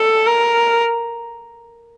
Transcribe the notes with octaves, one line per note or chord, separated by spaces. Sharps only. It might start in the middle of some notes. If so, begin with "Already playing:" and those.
Already playing: A4
A#4